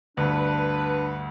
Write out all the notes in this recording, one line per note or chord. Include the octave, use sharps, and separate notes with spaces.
D2 G2 D4 B4